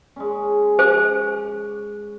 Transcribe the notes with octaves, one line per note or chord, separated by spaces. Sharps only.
G#3 C#4
C5